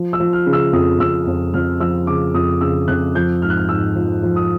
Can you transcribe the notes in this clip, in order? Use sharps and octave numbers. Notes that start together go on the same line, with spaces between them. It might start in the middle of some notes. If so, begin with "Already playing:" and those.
Already playing: F3
E6
F3
F6
C#3
E6
F2 D#6
F2 E6
F2
F2 F6
F3 E6
C#3 D6
F2 D#6
C#3 E6
F2 F#6
F3 G6
G#2 F6
F#6
F6
G#2 E6
F3
F3
D#6